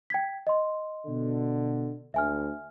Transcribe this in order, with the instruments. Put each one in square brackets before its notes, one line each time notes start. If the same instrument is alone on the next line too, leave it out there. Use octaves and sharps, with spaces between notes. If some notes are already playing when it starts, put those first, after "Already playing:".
[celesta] G5 G#6 B6
D#5 C6
[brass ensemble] B2 D3
[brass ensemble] D2 [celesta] E5 G#5 F6